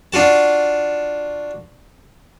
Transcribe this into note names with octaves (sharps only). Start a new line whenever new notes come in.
D4 F4 F#4 A5